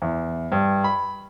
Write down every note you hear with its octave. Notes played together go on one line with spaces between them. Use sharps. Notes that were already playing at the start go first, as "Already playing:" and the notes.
E2
G2
B5